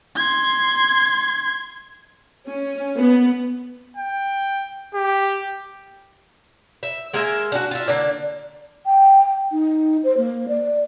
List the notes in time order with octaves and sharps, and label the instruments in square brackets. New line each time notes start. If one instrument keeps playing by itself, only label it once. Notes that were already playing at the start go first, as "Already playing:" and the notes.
[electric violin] C6 G#6
[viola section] C#4
B3
[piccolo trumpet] G5
G4
[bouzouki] E5
G#3 A#3 A#4 E5
D4 F#4
F4 E5
D3 A#3 D5
[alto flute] G5
D#4
C5
A#3
D5